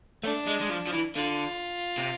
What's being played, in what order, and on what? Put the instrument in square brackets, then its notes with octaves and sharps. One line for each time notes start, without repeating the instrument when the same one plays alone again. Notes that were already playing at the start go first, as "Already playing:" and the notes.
[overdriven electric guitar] A3 [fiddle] D4
[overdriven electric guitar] G#3
G#3
F3
F3
E3
[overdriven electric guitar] D3 [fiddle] F4
[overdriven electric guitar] C3